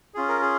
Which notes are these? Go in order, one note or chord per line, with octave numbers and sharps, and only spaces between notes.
C#4 F4 G#4
A#4
G#4